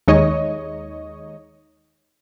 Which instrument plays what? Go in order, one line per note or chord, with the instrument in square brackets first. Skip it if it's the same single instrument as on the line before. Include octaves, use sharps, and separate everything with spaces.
[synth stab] D#2 G#3 D#4 C#5 D#5